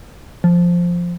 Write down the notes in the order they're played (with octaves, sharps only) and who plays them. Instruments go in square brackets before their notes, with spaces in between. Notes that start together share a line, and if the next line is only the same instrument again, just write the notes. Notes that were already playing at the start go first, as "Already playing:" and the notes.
[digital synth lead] F3